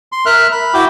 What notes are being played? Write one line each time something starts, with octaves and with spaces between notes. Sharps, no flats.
C6
A#4 E5 F6 F#6
B5
E4 F#4 G5 D6